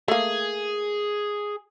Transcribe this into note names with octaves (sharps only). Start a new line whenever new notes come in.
A3 A#3 G#4